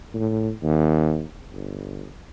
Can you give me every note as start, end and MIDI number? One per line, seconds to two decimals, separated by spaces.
0.14 0.51 45
0.63 1.24 39
1.53 2.06 31